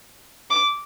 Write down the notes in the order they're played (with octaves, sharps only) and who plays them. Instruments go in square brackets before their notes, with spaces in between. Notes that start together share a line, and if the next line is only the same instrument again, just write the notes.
[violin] D6